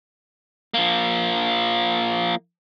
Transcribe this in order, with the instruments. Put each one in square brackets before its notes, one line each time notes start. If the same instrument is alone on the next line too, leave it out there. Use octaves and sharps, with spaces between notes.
[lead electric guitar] F3 A#3